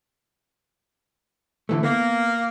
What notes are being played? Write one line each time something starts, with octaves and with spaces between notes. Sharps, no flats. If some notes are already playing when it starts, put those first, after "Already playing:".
D3 E3 A3
A#3 B3